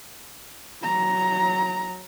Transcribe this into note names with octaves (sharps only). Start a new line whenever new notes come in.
F#3 A#5